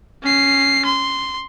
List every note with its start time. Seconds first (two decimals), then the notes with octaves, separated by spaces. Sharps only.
0.23 C#4 C7
0.85 C6